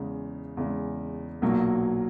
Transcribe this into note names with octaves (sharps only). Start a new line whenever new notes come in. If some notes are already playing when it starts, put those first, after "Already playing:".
Already playing: E2 C#3 G#3
E2 C#3 G#3
B1 A#2 F#3 A#3